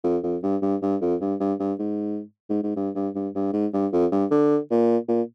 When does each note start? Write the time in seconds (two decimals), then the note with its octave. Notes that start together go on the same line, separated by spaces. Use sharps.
0.04 F2
0.23 F2
0.43 G2
0.62 G2
0.82 G2
1.01 F2
1.21 G2
1.40 G2
1.60 G2
1.79 G#2
2.50 G#2
2.63 G#2
2.76 G2
2.95 G2
3.15 G2
3.35 G2
3.53 G#2
3.73 G2
3.93 F2
4.12 G2
4.31 D3
4.70 A#2
5.08 A#2